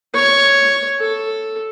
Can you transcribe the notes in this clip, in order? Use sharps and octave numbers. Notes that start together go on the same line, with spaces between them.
C#5
A4